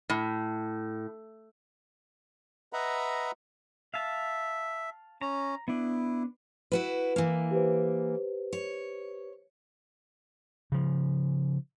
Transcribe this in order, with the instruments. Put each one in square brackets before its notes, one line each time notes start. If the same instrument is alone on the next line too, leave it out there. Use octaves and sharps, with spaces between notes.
[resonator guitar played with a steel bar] A2
[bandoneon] B4 D#5 E5 F#5 A#5 B5
[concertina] E5 [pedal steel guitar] F5 A5
[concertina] C#4 [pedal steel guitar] A#5
[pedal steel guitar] B3 D4 [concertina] E4
[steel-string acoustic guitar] E4 F#4 B4
E3 A#3
[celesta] G4 B4 C5
[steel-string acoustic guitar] C#5
[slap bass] C#3 F3